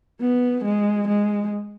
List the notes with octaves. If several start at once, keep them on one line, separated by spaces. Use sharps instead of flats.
B3
G#3
G#3